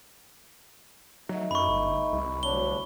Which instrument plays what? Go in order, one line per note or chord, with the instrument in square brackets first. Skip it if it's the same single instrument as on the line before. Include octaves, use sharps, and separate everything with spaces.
[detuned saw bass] F#3 [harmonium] A3 D#4
[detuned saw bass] F#2 [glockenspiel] B5 C#6
[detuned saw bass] G1
C2
[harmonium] D2 F#3 D4 [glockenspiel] G7